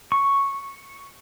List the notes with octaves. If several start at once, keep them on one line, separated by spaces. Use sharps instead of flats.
C#6